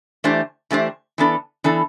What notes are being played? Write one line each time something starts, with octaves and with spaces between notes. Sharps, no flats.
E3 A3 D4 G4 C5
E3 A3 D4 G4 C5
E3 B3 D4 A4
E3 B3 D4 A4